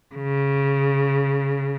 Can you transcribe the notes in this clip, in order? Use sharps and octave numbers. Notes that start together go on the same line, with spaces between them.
C#3